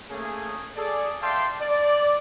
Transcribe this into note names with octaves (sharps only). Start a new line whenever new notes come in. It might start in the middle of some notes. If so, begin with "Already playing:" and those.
A3 A#3 C#4 G#4
G#4 A4 D5
D5 E5 F5 G5 A5 C6
D5